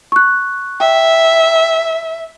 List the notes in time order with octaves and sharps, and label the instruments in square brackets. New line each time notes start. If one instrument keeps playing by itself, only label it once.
[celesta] C#6 F#6
[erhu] E5 [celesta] G5